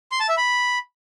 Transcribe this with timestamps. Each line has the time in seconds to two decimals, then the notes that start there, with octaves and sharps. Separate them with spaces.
0.12 C6
0.20 A5
0.29 E5
0.37 B5